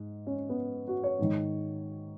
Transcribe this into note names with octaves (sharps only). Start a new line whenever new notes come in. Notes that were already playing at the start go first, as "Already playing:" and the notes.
Already playing: G#2
C#4
B3
F#4
C#5
G#2 D#3